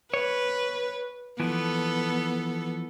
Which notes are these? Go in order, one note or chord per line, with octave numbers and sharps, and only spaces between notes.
B4 C#5
E3 F3 B3 A4